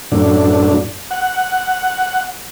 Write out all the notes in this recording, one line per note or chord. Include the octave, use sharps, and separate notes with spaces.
F#2 A2 D4
F#5